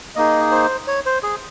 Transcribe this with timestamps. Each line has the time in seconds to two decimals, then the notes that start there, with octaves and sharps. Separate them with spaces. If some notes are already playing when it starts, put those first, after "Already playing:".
0.16 A#3 D#4 G#4 D#5
0.52 C5
0.87 C#5
1.06 C5
1.23 G#4